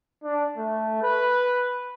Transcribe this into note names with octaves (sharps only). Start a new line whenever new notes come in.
D4
A3
B4